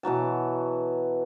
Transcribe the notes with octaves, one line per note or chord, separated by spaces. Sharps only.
B2 E3 F#3 A5